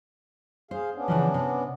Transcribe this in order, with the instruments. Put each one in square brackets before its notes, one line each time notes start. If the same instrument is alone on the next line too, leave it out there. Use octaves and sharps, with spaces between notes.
[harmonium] G#4 F5 [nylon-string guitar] C5
[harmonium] B3 C#4 D4
[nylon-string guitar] C#3 E3 F3
C3